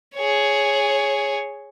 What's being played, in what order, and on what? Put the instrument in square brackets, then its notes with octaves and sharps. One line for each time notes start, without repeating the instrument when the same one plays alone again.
[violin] G#4 C#5